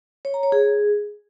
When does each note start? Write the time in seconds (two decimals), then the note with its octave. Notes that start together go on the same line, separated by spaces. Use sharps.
0.25 C#5
0.34 A#5
0.43 C#5
0.52 G#4